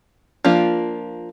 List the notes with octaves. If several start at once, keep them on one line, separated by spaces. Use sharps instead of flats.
F3 A#3 D4 F4